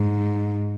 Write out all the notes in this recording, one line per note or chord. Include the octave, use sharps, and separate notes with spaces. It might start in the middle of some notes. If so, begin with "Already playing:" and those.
Already playing: G#2